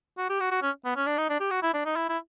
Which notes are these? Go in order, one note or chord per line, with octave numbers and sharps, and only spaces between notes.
F#4
G4
F#4
F#4
C#4
B3
C#4
D4
D#4
D4
G4
F#4
E4
D4
D#4
E4
E4